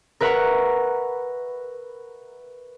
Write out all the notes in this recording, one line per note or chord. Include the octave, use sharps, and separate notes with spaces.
A#4 B4 E5 F#5 A#5 C#6